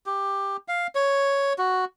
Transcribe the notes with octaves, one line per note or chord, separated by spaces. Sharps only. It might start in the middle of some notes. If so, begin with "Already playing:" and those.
G4
F5
C#5
F#4